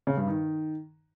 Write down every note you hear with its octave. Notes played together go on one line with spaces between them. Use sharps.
C#3
G2
D#3